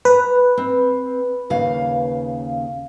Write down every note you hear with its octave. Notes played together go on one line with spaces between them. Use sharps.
B4 A#5
C4
D#2 C#3 F5